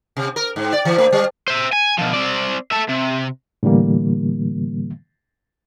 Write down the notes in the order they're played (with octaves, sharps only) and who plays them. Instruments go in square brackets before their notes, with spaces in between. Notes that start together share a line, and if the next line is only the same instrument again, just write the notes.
[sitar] C3
A#4
G#2
D5
E3
A3
G3
[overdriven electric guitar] C5 E5
G#5
B2 F3
C4 D5
A3 E5
C3
[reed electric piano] A2 D3 E3 G3 A#3